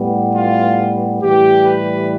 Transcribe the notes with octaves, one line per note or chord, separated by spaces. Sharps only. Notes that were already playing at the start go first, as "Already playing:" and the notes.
Already playing: A2 G3 B3
F4
A2 E3 G3 G4
B4